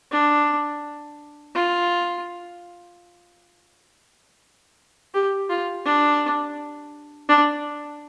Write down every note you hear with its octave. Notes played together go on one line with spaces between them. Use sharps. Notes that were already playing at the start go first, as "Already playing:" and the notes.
D4
F4
G4
F4
D4
D4